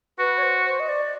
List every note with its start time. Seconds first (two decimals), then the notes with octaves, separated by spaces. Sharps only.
0.19 F#4 B4
0.38 C#5
0.43 C5
0.66 C5
0.80 D#5
0.89 D5